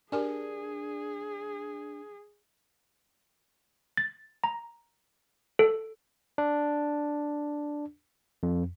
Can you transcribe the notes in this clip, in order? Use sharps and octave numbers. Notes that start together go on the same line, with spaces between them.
D4 G4 G#4 A#4 G#5
A6
A#5
A4
D4
F2